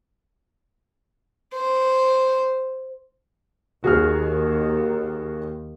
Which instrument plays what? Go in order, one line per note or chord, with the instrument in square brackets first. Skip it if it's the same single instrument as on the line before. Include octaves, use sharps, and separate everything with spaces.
[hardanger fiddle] C5
[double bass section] D#2 [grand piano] F#4 G#4 F6